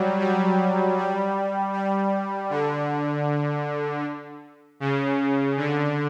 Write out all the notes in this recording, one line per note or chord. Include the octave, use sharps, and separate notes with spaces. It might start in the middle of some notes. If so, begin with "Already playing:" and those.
Already playing: F#3 G3
G3
G3
G3
D3
C#3
D3